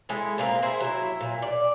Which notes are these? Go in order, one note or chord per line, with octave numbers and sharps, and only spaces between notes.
G#3 E4 G#4 A4
A#2 A#3 C4 A#5
E4 G#4 C5
F#3 E4
A#2
D5